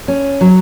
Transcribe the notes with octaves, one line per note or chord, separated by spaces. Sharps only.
C#4
F#3